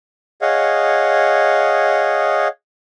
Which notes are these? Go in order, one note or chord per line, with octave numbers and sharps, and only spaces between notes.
G#4 C#5 D#5 F5 F#5